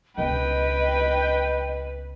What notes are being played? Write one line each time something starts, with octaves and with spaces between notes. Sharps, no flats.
C#2 B2 B4 D#5 G5